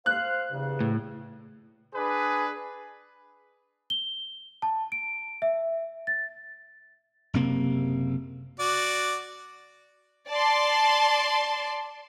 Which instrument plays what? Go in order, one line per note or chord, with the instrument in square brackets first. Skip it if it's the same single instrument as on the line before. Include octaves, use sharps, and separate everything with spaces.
[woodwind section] C5 F5 [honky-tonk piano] F#6
[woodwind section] E2 G2 C#3
[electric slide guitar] A2
[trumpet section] D4 B4 [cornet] G#4
[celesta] G7
A5
D7
E5
A6
[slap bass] F#1 C3 A#3
[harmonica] F#4 D5
[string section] D5 A5 C6